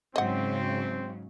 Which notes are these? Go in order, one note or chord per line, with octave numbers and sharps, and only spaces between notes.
G#2 C#3 F#3 C4 D#5 F#5